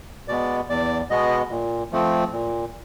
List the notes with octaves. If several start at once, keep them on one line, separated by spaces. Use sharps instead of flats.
B2 G#3 B3 D5
E2 D5
B2 G#3 B3 D#5
A#2
F3 A3 C4
A#2